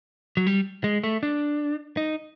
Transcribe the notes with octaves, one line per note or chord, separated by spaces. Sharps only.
F#3
G3
G#3
A3
D4
D#4